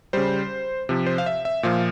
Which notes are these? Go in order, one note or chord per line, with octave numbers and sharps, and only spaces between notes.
C#3 G3 C5
C3 F3
C5
F5
E5
E5
A#2 F3 F5